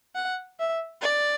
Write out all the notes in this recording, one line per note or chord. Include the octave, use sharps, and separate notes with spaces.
F#5
E5
D5